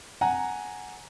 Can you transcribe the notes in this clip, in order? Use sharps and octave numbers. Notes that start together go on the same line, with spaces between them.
F#5 G#5 A#5